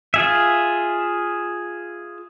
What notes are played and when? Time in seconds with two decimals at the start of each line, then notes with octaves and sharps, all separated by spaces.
0.14 F4 G#4 E5